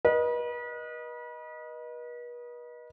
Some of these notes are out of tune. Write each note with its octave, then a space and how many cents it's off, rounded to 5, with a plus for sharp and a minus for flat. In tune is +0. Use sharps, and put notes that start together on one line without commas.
B4 -40 D#5 -5